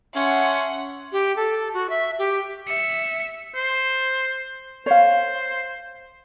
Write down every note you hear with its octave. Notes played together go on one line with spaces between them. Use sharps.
C#4 F#4 A4 E5 F#5 C6
G4
A4
F#4
E5
G4
E5 C#7
C5
C5 C#5 F5